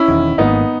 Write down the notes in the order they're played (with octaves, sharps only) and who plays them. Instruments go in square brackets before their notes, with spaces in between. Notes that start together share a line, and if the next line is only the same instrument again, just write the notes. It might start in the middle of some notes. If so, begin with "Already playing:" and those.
Already playing: [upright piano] C#4 E4
[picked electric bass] E1 E2 D#3
[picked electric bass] G#1 G#2 D#3 A#3 [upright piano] B3 D#4